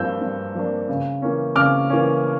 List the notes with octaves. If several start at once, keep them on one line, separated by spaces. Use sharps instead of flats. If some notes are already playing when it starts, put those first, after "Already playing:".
Already playing: G2 F3 A#3 D4 E6 G6
G2
F3 A#3 D4
C#3
E3 A#3 C#4
C#3 D6 F6
E3 A#3 C#4